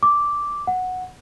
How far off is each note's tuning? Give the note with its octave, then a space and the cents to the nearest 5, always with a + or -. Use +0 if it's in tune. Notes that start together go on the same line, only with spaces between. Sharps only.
D6 -5
F#5 -5